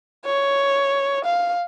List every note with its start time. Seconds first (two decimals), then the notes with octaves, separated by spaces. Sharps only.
0.25 C#5
1.25 F5